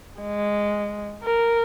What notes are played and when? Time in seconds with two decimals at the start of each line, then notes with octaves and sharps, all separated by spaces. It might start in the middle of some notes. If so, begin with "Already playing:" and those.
0.21 G#3
1.23 A#4